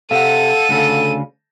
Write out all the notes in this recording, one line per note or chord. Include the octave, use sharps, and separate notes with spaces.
C3 A4 F5 F#5 D#7
D2 C#3